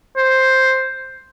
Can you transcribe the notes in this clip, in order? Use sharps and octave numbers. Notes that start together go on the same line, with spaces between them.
C5